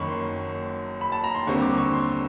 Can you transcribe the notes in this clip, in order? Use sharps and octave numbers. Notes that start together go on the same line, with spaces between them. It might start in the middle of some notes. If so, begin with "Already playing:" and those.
Already playing: F#1 F#2 D#3 F#3 B5 C#6
C6
B5
A5
A#5
C6
D#2 D3 G3 C4 C#6
D6
C#6
C6